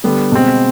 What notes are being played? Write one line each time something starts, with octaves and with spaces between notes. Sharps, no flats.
D3 G3 B3
B2 G#3 C4